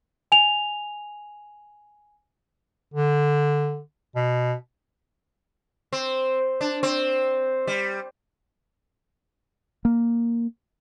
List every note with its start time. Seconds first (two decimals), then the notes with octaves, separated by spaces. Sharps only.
0.32 G#5 F7
2.94 D3
4.16 B2
5.93 C4
6.61 D4
6.83 C4
7.67 G3
9.85 A#3